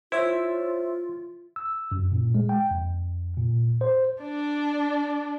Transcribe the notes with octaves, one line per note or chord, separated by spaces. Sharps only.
E4 F4 C5 C#5 E5
E6
F#2
A#2
G#3
G5
F2
A#2
C5
D4 D5